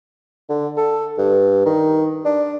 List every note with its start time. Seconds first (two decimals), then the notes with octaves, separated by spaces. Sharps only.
0.50 D3
0.77 A4
1.18 G2
1.65 D#3
2.25 D4